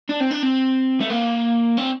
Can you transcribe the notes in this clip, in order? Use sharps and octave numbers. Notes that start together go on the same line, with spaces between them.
D4
C4
D4
C4
A3
A#3
C4